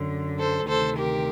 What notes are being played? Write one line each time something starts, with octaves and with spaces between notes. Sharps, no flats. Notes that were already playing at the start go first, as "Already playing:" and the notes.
Already playing: F#2 D3
A4 C5
D2 C3 D#3 A4 C5
G4 A#4